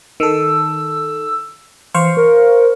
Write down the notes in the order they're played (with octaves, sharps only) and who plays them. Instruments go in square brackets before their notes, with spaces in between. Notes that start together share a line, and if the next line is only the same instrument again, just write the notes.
[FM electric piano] D#3 A4 [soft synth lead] E6
[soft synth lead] E3 [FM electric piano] C5 F5 C#6
[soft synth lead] A#4